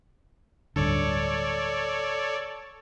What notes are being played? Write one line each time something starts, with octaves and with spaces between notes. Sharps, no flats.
D1 G2 D3 A4 C#5 D5